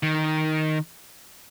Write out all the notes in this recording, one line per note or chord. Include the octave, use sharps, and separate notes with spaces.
D#3